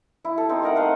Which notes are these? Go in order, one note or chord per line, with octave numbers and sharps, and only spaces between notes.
E4
A4
C4 D#4
A3 D#4 A#4 F#5
C5 D#5 F5 F#5